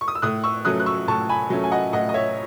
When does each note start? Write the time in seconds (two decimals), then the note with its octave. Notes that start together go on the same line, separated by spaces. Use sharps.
0.01 C#6
0.08 D#6
0.15 E6
0.22 A2 D#6 F#6
0.44 C#6 E6
0.65 F#3 A3 C#4 D#6 F#6
0.80 F#6
0.86 C#6 E6
1.08 A2 A5 C#6
1.29 G#5 B5
1.50 F#3 A3 C#4
1.64 G#5
1.72 D#5 F#5
1.93 A2 D#5 F#5
2.09 D#5
2.14 C#5 E5